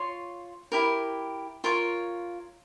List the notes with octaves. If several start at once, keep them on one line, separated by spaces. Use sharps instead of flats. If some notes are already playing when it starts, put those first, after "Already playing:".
Already playing: F4 C#5 C6
E4 G4 A#4
F4 A#4 C#5